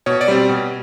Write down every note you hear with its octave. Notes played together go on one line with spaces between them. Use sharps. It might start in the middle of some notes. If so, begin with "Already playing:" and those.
B2 C#5
D5
G3 C4
B2